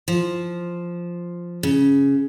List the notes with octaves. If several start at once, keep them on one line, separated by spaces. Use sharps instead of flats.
F3
C#3